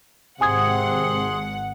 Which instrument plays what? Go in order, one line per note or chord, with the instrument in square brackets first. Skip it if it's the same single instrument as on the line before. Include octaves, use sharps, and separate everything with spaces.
[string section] G#1 F#5 [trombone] C3 [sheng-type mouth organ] G#4 C6 [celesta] G#5 D#6 G#6